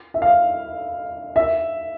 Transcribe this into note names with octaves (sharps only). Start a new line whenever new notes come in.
E5
F5
E5